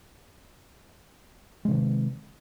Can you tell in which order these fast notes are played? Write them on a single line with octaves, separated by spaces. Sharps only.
G#3 C3 D#3